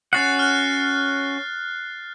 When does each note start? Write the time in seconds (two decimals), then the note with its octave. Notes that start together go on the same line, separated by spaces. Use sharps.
0.13 C#4 F#4 F#5 F#6 A6 C7
0.39 F6 F#6